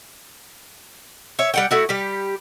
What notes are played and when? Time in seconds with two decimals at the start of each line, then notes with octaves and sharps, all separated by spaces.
1.39 C#5 E5
1.54 G3 F#5 G5
1.71 A3 E4 F#4
1.89 G3 G4